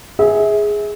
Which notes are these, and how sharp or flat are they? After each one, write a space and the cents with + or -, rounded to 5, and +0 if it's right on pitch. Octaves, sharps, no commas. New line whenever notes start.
G#4 +0 E5 -30